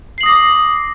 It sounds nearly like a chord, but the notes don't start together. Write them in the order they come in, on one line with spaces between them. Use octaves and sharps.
C7 F#7 D#6 A#6 D6